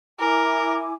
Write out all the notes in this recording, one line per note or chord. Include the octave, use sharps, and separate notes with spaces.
E4 A#4 G#5 D6